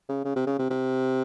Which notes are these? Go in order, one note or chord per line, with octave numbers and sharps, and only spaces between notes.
C#3
C#3
C3
C#3
C3
C3